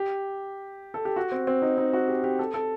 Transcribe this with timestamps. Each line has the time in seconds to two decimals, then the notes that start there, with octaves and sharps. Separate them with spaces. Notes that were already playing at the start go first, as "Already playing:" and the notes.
Already playing: G4
0.94 A4
1.05 G4
1.16 F#4
1.32 C4
1.47 C4
1.62 D#4
1.78 D#4
1.93 F#4
2.08 G4
2.24 G4
2.39 A4
2.54 A4